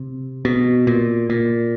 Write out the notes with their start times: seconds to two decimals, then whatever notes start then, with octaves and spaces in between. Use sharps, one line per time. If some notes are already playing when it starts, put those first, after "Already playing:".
Already playing: C3
0.45 B2
0.87 A#2
1.30 A#2